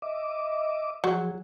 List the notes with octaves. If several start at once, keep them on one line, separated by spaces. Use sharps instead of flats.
D#5 E5 D6
F3 F#3 F#4 G#4